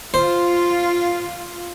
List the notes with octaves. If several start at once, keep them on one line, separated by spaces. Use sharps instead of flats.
F4 C5